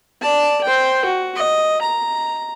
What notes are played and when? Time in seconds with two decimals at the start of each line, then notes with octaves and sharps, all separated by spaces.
0.22 D5 A5
0.64 C5 G5
1.05 F#4
1.36 D#5
1.82 A#5